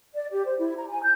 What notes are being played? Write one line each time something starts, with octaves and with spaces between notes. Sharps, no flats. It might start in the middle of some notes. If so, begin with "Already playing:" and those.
D5
G4
C5
E4
A#5
G#5
G6